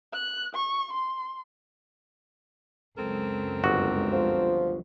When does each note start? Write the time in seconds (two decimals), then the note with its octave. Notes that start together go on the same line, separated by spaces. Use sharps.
0.14 F#6
0.55 C#6
0.93 C6
2.98 C#2 F#2 C4 A4 A#4
3.64 G1 F#4
4.13 F3